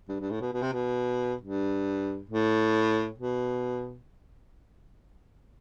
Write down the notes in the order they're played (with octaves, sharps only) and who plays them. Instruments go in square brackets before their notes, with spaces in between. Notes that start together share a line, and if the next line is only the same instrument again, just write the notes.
[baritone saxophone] G2
G2
A2
B2
B2
C3
B2
G2
A2
B2